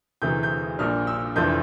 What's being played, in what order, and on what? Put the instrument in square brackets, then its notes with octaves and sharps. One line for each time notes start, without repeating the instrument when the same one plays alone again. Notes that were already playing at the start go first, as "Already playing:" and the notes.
[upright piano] E1 D2 C3 E3 A3 G6
G6
A#1 A#2 G3 D4 F6
E6
F1 F2 E3 A3 D4 G6